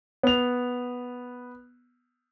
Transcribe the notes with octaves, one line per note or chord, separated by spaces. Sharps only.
B3 F7